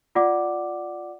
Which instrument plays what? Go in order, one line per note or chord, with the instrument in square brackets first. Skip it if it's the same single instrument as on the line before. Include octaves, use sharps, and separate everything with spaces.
[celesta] F4 D5 F#5 D6